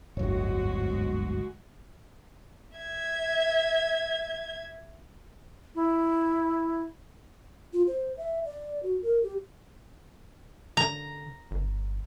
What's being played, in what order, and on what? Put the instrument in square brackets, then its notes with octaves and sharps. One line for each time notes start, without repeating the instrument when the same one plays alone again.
[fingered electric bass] D1 G1 [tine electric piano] F2 C#5 [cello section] G#2 G#3 F#4
[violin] E5 G#6
[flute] E4
[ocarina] F4
C5
E5
D5
F#4
A#4
G4
[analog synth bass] D3 [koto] A#5
[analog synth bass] G1